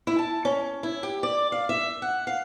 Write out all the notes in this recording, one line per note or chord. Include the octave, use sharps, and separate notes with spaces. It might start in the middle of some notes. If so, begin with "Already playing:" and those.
E4
A5
C#4
E4
G4
D5
F5
E5
F#5
F5